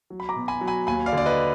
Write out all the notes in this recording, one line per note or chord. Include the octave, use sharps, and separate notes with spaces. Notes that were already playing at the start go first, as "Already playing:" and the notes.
F#3
B5
A#5 D6
B2
G#5 B5
F#3
G#5 B5
D#2 G#5 B5
D5 F5
D3
D5
B4 D#5